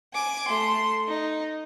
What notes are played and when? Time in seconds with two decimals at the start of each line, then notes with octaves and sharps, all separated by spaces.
0.13 G#5 D6
0.48 A3 C6
1.08 D#4